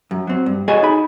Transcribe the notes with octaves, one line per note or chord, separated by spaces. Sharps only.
F#2
F#3 C4
G2
F#4 G#4 A4 C#5 D#5 G#5
D#4 B5